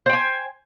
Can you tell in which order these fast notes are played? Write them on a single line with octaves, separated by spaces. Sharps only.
C5 G5 G#5